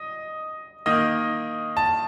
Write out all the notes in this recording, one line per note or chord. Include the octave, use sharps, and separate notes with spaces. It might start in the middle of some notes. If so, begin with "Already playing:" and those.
Already playing: D#5
D#3 A#3 D#5
A5